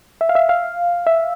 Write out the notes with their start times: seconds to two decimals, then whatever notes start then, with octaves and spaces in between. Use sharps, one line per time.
0.21 E5
0.29 F5
0.35 E5
0.49 F5
1.07 E5